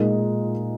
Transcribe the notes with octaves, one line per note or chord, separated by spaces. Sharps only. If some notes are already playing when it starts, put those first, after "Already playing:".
Already playing: A#2 G#3 D#4 A#4